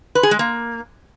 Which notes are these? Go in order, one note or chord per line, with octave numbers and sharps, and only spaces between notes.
B4
G#4
G#3
A#3